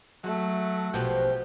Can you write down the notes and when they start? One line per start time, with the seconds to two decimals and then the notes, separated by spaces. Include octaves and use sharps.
0.24 F#3 A3
0.94 A#1 B2 F3 F#4 G4